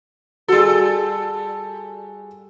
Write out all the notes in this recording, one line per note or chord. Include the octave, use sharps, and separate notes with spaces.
G3 F#4 G#4 A4